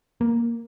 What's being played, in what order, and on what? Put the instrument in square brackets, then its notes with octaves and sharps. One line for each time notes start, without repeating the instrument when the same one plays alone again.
[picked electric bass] A#3